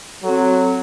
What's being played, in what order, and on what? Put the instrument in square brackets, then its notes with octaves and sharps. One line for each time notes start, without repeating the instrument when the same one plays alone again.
[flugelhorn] F#3 [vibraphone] C4 A4